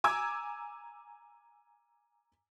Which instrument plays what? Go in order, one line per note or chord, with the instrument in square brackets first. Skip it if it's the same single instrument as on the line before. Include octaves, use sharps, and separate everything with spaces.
[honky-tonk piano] G#5 A#5 D6 E6 G#6